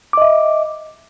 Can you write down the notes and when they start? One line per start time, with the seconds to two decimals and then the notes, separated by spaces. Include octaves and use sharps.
0.13 D6
0.17 D#5
0.22 E5